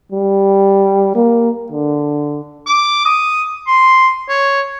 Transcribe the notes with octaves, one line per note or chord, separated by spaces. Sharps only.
G3
A#3
D3
D6
D#6
C6
C#5